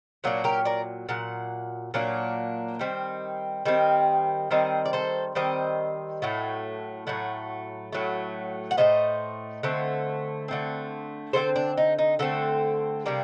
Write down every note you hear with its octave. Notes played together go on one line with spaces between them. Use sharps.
A#2 F#3 A#3 D4
G4 A#4
A#4 D5
A#2 F#3 F#5
A#2 F#3 A#3 D4
D#3 G3 C4
D#3 G3 C4
D#3 G3 C4 C5 D#5
D5
A4 C5
D#3 G3 C4 C5 D#5
A2 F#3 A3
A2 F#3 A3 F#5
A2 F#3 A3
F#5
A2 F#3 A3 C5 D#5
D3 A3 C4
D3 A3 C4
D3 A3 C4 A4 C5
D4
D#4
D#4
D3 A3 C4 F#4 A4
C3 G3 A#3 D4